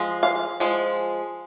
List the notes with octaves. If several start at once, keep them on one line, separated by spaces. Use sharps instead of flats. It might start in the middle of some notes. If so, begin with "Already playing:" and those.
Already playing: F3 G#3
F5
F3 G#3